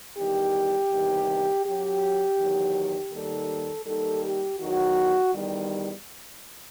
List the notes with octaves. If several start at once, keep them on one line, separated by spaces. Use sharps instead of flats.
E2 D#3 G3 G4
E2 C3 D#3 G3
F#2 F#3 G4
E2 D#3 F#3
D#2 D#3 G3 A4
D#2 D#3 G3 A4
G4
E2 D#3 F#3 F#4
E2 D#3 G3